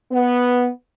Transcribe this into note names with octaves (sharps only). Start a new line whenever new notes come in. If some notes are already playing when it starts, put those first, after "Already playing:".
B3